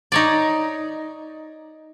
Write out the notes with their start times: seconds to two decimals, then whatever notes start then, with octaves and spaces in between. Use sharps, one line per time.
0.12 D#4 C#5 D5